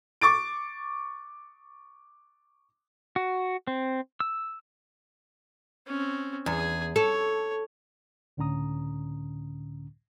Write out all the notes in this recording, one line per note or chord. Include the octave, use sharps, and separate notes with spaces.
C#6 D6 A6 D7
F#4
C4
E6
C4 C#4
E2 G#4 G#5
A4 C#5
C#2 A2 D3 C#4 A#5 D#6